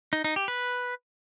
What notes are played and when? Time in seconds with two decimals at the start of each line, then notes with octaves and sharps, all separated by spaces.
0.13 D#4
0.24 D#4
0.36 G4
0.48 B4